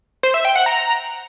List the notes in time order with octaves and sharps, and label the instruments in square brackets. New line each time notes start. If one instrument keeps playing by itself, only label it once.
[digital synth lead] C5
E5
G5
F#5
A#5